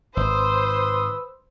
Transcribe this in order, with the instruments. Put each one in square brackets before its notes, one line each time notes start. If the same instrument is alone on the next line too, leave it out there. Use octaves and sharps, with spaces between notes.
[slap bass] G#1 [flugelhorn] B4 [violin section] C5 [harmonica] C6 D#6 E6